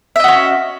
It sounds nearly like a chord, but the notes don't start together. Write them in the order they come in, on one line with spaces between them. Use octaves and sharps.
E5 D#5 F#4 C#4